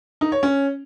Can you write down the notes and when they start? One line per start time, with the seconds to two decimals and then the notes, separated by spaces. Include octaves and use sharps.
0.21 D#4
0.32 C#5
0.43 C#4